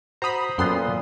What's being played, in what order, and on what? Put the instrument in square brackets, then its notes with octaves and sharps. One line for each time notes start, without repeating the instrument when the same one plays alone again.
[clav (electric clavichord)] F#4 [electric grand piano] C5 D#6 [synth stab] A#5 B5
[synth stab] F#2 C6 [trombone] A#2 [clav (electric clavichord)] B3 A4 G5